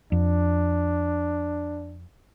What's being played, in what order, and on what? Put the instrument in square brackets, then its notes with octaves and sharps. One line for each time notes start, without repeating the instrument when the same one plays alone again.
[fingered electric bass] F2 [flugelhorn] D4